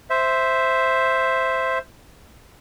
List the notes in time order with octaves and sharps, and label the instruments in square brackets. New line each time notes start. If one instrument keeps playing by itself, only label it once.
[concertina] C5 E5